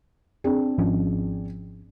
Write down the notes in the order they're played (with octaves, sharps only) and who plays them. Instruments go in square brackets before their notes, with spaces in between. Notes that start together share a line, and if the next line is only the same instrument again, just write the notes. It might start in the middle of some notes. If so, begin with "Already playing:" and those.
[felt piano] C4 D4 G#4
[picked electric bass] G#1 F3 C#4